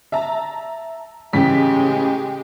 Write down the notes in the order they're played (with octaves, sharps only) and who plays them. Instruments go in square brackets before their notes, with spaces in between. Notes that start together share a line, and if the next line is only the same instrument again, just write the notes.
[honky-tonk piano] E5 A5 A#5
[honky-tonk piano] A1 C#3 B6 [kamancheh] G#3 G4